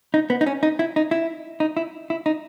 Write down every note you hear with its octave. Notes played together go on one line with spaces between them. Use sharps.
D#4
B3
D#4
C#4
D#4
E4
D#4
E4
D#4
E4
E4
D#4